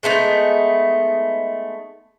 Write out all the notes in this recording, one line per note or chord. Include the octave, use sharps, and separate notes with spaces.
G#3 A3 B3 D#4